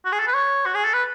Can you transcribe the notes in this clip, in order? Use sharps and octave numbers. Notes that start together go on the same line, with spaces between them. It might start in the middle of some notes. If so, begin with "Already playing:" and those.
F#4
G#4
A4
B4
C#5
F#4
G#4
A4
B4